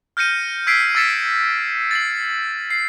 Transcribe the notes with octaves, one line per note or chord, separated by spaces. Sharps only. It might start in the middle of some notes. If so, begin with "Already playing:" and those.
F6 G6 A#6 C#7 D#7
E6 G#6 B6 C7 D7
E6 G#6 A6 B6 C#7 E7
A6 C7 F#7
C7